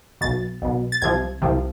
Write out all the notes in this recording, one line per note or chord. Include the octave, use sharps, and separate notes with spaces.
B1 B2 A6
B1 B2
A6
C2 C3 F3 G#6
C2 C3 F3